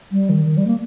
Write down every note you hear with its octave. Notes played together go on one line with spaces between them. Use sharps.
G3
D#3
D#3
G3
A#3